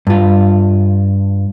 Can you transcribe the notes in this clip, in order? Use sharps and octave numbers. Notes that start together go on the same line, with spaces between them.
G2 F4